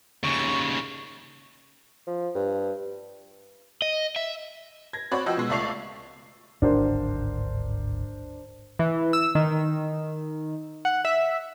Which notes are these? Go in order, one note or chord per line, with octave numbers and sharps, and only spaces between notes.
D#2 C#3 C#6
F3
G2
D#5
E5
G#6 A#6
C4 F#4 C#5 D5 B5
F3 F#4 D#5 G5 E6
B2 G#3
C#2 A3 D5 C#6 C7 F7
D1 G#1 G2 D4 A#4 C5
E3
E6
D#3
F#5
E5